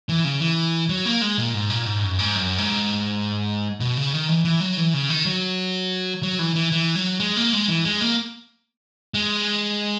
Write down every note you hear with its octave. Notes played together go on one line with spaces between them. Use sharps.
E3
C#3
E3
F#3
A#3
G#3
A#2
G#2
A#2
G#2
F#2
G#2
F#2
G#2
B2
C#3
D#3
E3
E3
F#3
E3
C#3
D#3
F#3
F#3
E3
E3
E3
F#3
G#3
A#3
G#3
E3
G#3
A#3
G#3